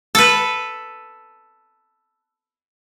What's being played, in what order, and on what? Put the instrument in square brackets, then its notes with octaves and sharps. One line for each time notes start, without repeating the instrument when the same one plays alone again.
[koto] A4 B4